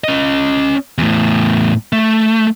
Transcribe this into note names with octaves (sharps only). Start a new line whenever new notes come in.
C#4 D#5
E2 A2
A3